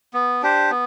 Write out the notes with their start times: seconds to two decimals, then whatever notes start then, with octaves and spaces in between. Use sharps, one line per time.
0.14 B3
0.43 D4 G4 C5
0.70 B3